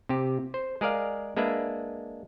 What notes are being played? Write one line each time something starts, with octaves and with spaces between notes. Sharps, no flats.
C3 G4
C5
G#3 G#4 A#4 D5 F5
G#3 A#3 D4 B4 E5